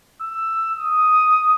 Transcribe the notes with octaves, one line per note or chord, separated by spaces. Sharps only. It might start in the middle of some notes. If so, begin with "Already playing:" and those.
E6
D#6